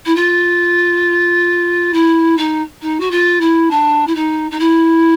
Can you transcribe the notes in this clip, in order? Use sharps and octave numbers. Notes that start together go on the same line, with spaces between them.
E4
F4
E4
D#4
D#4
F#4
F4
E4
D4
E4
D#4
D#4
E4